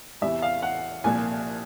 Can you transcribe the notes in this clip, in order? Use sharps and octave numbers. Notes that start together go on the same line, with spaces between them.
E2 C3 E3 E5
F5
F#5
C2 A#2 F3 G#5